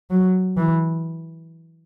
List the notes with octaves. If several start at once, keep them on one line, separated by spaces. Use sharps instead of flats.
F#3
E3